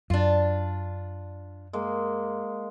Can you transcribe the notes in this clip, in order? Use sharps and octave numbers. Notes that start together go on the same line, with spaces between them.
F#2 D4 F4
G#3 A#3